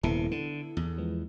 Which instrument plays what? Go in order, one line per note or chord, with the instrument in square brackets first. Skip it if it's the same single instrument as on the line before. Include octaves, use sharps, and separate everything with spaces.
[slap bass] D#1 C3 [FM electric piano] B3 E4 A4
[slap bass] D3
E2
[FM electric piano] F3 G#3 B3